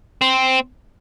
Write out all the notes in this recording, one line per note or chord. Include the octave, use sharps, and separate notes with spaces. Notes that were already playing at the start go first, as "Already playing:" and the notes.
C4